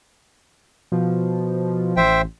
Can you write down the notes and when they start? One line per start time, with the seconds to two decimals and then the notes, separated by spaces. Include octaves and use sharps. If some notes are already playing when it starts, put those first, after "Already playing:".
0.92 B2 F3
1.97 A1 C5 E5 G5